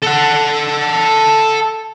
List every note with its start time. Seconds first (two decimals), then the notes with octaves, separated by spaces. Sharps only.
0.03 A4 F#5